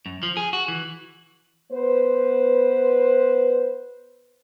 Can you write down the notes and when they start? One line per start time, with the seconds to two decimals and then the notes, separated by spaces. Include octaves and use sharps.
0.06 F#2
0.23 F3
0.37 G#4
0.53 F#4
0.68 E3
1.71 B3 B4 C5